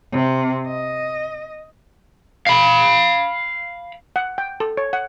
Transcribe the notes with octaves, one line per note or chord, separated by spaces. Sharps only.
C3
D#5
F5 B5
F#5
G5
A4
C#5
F#5